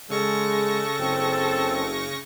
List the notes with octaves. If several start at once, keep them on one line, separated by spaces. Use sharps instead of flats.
C#3 G#3 A4 C#6 A#6
F#1 C4